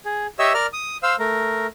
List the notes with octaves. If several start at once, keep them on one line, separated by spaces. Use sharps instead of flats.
G#4
G4 C#5 D#5 E5 E6
A#4 D5 F6
D#6
C5 F5 E6
A3 A#4